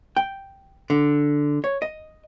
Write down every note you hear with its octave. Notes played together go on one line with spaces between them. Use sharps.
G5
D3
C#5
D#5